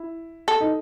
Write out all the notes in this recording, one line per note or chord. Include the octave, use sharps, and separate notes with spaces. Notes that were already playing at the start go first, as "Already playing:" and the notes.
Already playing: E4
A4
D#4